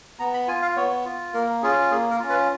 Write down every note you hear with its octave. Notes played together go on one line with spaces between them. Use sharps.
B3 A#5
B5
F4 G#5
F5
B3 C#5
F4
A#3 A#4
C#4 F4 G#4
A#3 G#4
A#4
C#4 F4
B4